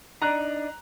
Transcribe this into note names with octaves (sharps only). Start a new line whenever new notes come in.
D4 D#4 A#5 F#6